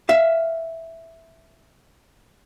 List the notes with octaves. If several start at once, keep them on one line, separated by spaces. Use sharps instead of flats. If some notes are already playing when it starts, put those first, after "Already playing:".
E5 F5